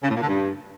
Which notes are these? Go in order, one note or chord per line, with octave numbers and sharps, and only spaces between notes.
C#3
A2
A#2
D3
G2